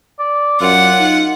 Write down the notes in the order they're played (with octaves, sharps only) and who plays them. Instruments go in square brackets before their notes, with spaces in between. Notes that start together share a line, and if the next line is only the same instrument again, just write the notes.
[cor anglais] D5
[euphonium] F#2 [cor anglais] F4 [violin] F#5
[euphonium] D#4